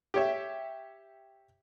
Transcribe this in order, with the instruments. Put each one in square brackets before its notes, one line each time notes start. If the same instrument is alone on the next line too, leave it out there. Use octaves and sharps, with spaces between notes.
[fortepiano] G4 C#5 E5